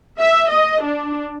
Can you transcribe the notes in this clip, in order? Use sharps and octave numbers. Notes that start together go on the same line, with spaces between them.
E5
D#5
D4